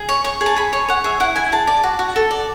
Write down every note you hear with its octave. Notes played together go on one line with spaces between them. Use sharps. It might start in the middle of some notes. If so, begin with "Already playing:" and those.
Already playing: G#4
C#5
C#5 C#6
G#4
A5
G#4 B5
C#5 G#5
C#5 F#5
G#4 E5
E4 F#5
E4 G#5
G#4 A5
D5
F#4
F#4
A4
D5